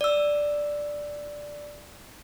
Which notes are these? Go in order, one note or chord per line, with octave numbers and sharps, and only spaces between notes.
D5 E6